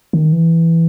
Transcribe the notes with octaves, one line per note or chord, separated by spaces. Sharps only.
D#3
E3